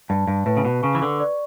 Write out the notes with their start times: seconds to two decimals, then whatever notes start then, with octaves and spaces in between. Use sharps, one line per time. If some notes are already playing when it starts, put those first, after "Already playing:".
0.09 G2 A5
0.28 G2
0.46 A2 B4
0.57 C#3
0.65 B2
0.83 C#3 C#6
0.95 E3
1.02 D3
1.20 D5